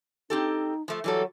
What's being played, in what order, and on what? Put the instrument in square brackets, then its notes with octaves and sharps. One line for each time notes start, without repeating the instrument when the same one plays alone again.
[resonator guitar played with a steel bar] C4 G4 A4 [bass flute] D#4
[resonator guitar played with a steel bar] F3 A3
[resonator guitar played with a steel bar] E3 G3 A4 [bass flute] F#3